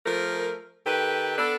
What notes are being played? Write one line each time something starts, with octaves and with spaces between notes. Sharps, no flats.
F3 A3 A#4
D#3 G4 A4 B4
B3 D4 A4